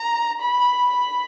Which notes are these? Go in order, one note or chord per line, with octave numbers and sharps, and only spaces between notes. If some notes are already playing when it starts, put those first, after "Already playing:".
Already playing: A#5
B5
B5